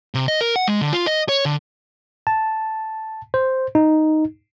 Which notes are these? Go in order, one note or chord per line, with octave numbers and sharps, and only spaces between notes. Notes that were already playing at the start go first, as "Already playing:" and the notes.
C3
D#5
A#4
F#5
G#3
D3
F4
D#5
C#5
D3
A5
C5
D#4